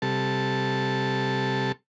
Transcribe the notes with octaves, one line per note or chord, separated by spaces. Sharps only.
C3 G3 A4 A5